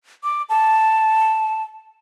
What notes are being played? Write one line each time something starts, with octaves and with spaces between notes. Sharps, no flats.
D6
A5